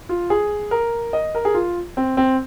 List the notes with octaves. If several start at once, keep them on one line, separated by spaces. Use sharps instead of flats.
F4
G#4
A#4
D#5
A#4
G#4
F4
C4
C4